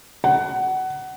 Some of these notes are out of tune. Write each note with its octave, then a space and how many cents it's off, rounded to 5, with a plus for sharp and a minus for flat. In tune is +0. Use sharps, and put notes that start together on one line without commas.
F#5 +20